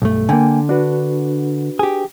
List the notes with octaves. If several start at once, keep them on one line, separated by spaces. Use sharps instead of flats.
B1 G2 A3
D3 A#3 G5 G#5
D4 F#4 B4
G4 G#4